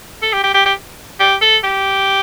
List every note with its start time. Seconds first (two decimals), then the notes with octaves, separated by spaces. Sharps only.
0.23 A4
0.33 G4
0.44 G4
0.54 G4
0.65 G4
1.20 G4
1.41 A4
1.64 G4